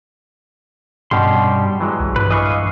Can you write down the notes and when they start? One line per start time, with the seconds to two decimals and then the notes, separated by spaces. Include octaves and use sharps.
1.11 G2 B2 G3 C#4 G4 C6
1.81 E3 F#3 G#3
2.00 A#1
2.16 G2 B4
2.31 E3 D#5 F5 C#6